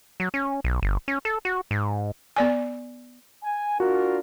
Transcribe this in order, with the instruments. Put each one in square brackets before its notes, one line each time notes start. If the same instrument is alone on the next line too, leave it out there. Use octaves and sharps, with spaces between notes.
[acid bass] F#3
C#4
B1
G1
C#4
A4
F#4
G#2
[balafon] B3 D5 G#5
[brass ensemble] G#5
[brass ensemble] D4 F4 A#4 [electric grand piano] F#4